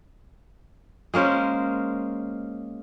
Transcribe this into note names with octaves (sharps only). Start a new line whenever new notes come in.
G#3 A#3 C#4 C5